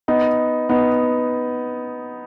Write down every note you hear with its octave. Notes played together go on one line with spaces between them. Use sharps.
B3 D#4
B3 D#4